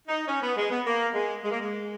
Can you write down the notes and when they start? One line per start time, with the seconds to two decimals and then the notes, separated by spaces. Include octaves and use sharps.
0.08 D#4
0.28 C#4
0.42 B3
0.57 G#3
0.70 B3
0.86 A#3
1.15 G#3
1.44 G#3
1.51 A#3
1.60 G#3